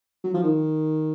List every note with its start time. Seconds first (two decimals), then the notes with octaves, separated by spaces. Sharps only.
0.24 F#3
0.34 F3
0.43 D#3